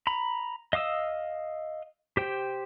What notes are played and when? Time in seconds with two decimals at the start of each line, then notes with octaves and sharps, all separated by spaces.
0.07 A#5 B5
0.73 D#5 F5 D#6 E6
2.17 G4 C5 G5